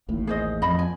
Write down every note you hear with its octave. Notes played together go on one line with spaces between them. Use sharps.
A1 D#2 A2
G#4 C5 D#5
F2 D#5 B5
G#5